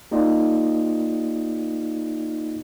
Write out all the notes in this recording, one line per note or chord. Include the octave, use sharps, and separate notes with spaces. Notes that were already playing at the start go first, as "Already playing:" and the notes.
A#3 D#4 F4 G4 D5 D#5